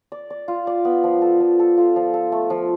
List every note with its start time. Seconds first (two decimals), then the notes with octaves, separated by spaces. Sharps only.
0.12 D5
0.30 D5
0.48 F4
0.67 D5
0.85 B3
1.04 F3
1.22 A4
1.40 F3
1.59 A4
1.78 F4
1.96 F3
2.14 A4
2.32 A3
2.50 F3